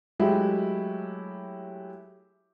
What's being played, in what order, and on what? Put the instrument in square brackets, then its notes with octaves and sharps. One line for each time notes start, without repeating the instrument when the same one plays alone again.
[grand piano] F#3 G#3 A3 E4 F#4 G4